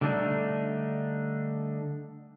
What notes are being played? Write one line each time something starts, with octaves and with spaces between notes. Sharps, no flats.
D3 G3 A3 D4 D#4